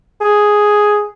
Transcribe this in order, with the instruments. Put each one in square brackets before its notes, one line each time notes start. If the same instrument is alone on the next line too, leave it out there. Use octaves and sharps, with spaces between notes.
[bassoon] G#4